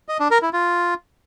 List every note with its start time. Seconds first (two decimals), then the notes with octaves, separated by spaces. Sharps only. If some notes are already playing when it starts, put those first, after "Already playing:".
0.08 D#5
0.20 D4
0.31 A#4
0.42 E4
0.53 F4